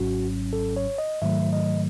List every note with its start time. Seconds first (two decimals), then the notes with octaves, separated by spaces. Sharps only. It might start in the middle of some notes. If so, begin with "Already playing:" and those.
Already playing: G#1 G#2 F#3 C#4 F#4
0.53 A4
0.76 C#5
0.98 D#5
1.22 G#2 D#3 F#3 A3 E5
1.53 D#5